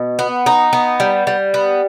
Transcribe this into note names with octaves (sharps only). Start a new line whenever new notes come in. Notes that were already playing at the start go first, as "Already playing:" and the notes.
Already playing: B2
B3
D#4
B3
G3
G3
B3